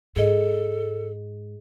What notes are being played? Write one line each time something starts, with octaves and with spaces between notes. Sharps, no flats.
G#2 G#4 A4 D#5